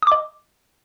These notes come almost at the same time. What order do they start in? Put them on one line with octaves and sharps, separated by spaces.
D#6 D6 D#5